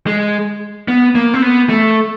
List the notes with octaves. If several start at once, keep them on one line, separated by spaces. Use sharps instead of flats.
G#3
B3
A#3
C4
B3
A3